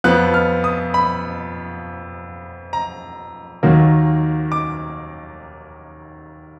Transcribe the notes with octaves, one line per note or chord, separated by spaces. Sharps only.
F2 F3 B3 F#6
F6
D#6
B5
A#5
D#2 D#3 F#3 A#3
D6